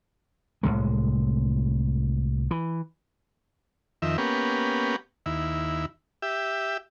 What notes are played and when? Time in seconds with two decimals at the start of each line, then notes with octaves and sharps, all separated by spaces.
0.63 C2 F2 A2 G#3
2.51 E3
4.02 F2 D#3 E5
4.18 A#3 B3 C#4 G4
5.26 D#2 E4
6.22 G4 E5